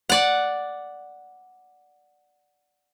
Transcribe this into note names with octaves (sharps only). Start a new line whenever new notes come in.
D5 F#5